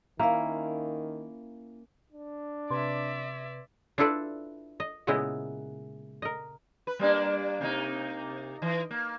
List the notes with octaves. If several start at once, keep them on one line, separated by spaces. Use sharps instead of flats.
D#3 A#3 C#4 E4 F5 A#5
D4
C3 B4 D5 E5 C6 G#6
D4 E4 F4 A4 B4 D5
D#5
A#2 C#3 G#3 B3 E4 D#5
A#4 D#5
B4
G3 A#3 D4
C3 A#3 D#4
E3
A#3